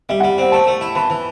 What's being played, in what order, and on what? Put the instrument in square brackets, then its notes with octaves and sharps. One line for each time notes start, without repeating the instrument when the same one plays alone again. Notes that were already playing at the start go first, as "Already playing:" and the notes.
[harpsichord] G3 [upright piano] E5
[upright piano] F#5
[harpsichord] G3
[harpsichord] C4 [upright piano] F#5
[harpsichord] A3 [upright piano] A5
[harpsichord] A3
E4
[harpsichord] E3 [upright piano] B5
[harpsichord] E3